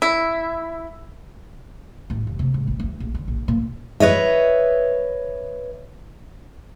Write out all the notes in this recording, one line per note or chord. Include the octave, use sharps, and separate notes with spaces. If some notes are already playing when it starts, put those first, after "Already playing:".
E4
A1
F1
C3
G#2
A1
D2
A#1
D3
A#1
A#2
B4 C#5 D#5 E5